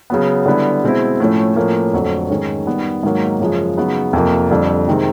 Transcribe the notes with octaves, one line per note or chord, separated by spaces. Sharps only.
C#3 F#3 B3
D3 G3 B3 E4
B2 G#3 C4 E4
A2 F3 A3 C#4
A2 F3 A#3 C#4
F2 D3 F#3 A3 C4
G#2 D#3 G#3 C#4
D#3 G3 B3
G#2 D#3 F#3 A#3
F#2 C#3 F3 G#3
C#3 F#3 B3 D#4
F2 C3 F3 A#3
F2 D3 G3
C3 D#3 G#3 C4